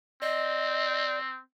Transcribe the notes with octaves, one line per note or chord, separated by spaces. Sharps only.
C4 D5 D#5